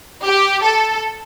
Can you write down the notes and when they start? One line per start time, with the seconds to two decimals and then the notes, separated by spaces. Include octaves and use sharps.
0.25 G4
0.63 A4